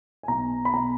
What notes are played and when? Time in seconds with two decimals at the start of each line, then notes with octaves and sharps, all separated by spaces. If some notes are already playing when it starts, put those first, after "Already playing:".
0.23 G#5
0.28 B1 A#5
0.65 B5
0.73 B2 A#5